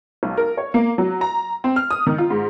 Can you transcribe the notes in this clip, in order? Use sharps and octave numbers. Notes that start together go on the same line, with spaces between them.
B1
A#4
C#5
A#3
F#3
A#5
C4
F6
D#6
D#3
F4
G#2